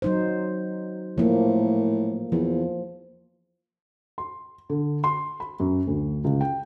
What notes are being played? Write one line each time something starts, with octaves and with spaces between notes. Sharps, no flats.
F#3 D#4 C5
A2 F3 A#3
E2 F3
C6
D3
C6
B5
F#2
D2
C#2
G5